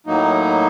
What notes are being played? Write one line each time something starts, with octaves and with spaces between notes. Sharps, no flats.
A2 F#3 A#3 D#4